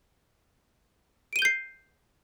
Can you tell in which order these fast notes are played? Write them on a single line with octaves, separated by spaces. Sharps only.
D7 D#7 G7 G6 C7